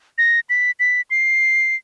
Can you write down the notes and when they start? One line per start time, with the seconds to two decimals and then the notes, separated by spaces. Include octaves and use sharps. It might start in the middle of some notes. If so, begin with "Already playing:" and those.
0.18 A#6
0.49 B6
0.80 B6
1.11 C7